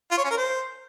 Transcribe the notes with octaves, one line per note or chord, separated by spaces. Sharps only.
F4
C#5
C#4
A#4
C5